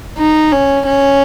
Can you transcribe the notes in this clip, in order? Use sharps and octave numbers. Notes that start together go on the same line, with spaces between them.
D#4
C#4
C#4